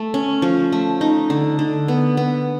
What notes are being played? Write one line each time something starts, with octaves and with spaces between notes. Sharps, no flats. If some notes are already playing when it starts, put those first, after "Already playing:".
Already playing: A3
C#4
F3
A3
D#4
D3
D3
B3
B3